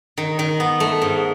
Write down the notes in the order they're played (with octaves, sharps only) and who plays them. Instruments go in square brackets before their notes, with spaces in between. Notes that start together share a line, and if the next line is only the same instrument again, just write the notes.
[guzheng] D#3
D#3
B3
A3
G#2